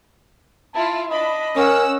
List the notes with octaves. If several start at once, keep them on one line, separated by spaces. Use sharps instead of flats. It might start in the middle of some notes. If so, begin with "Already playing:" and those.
E4 F4 A5
D4 D#5 B5
C#4 A#4 F#5 E6